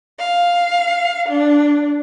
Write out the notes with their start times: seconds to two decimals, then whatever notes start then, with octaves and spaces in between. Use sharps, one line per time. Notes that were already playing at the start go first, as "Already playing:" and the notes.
0.19 F5
1.27 D4